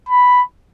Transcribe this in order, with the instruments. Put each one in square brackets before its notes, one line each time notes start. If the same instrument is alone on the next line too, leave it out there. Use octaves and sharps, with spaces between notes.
[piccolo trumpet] B5